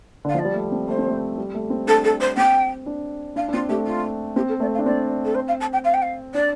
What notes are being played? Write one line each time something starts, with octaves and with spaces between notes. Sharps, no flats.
D3 F5
F3 D5
G3
A3
C4
A3 C5
C4
A3
G3
A3
C4
D4 A4
A4
C5
C4 G5
D4
D4 F5
D4
C4 F4
A3 G4
F4
C4 G4
A4
A3 D5
F5
D4
C4 D5
A4
C5
F5
A5
G5
F5
G5
F5
D4 D5